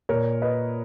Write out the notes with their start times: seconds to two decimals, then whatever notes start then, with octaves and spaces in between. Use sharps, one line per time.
0.09 A#2 A#4 C#5
0.42 B4 D#5